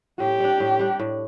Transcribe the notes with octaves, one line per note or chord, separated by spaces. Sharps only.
A2 G4
G3 D4
A2
G3 D4
A2